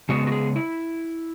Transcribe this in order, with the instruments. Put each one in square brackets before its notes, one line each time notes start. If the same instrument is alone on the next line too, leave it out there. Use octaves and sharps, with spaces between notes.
[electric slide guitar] C#3 G#3 B3 F#4
F#4
G#4
E4